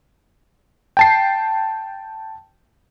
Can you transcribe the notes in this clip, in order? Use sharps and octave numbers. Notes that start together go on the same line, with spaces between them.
G5 A5 C7